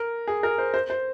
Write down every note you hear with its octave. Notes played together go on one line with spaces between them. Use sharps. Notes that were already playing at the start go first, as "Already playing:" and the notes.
Already playing: A#4
G#4
A#4
C5
C5
C5